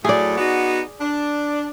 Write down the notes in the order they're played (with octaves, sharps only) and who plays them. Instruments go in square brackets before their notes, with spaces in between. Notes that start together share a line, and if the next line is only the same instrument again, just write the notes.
[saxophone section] A2 F#3 A3 [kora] G#4 D5
[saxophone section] B3 D#4 F#4
D4